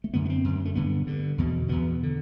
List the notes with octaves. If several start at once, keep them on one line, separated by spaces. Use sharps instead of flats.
A3
F#2 D3 B3
B3
C4
F#2 D3
A3
G2 D3 B3
G2 D3
E2 B2
E2 B2 B3
D3